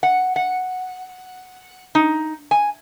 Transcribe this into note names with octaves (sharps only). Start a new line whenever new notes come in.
F#5
F#5
D#4
G#5